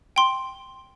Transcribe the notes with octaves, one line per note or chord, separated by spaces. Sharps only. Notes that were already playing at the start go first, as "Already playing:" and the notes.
G5 C6